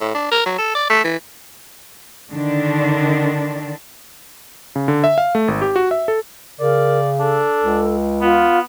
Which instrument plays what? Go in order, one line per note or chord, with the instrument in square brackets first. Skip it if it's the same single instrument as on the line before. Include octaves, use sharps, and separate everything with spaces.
[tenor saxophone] A2
D4
A#4
F#3
A4
D5
A3
E3
[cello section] D3 D#3 D4
[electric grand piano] C#3
D3
E5
F5
A3
G#1
G4
F#4
E5
A4
[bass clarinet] C#3 [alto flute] A#4 [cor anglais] D5
[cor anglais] D4 [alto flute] A4
[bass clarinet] C#2
[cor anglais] B3 [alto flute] F4